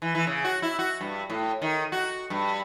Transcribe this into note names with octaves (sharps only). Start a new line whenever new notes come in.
E3
E3
C#3
F#4
E4
F#4
G2
A2
D#3
F#4
G2